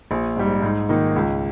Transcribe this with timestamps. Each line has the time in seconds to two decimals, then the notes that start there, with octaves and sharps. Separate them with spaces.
0.11 A#1
0.37 G#2 G3
0.62 G#2
0.89 D#3 A#3 D#4
1.16 C#2